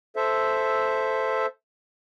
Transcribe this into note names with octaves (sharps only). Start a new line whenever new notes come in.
A4 C5 E5